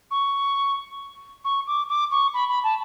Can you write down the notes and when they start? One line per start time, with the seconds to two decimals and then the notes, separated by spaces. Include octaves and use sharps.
0.10 C#6
1.44 C#6
1.67 D6
1.88 D6
2.11 C#6
2.33 B5
2.48 B5
2.63 A5